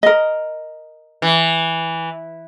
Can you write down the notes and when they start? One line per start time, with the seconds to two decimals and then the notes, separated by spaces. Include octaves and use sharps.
0.03 A#4 D#5
1.22 E3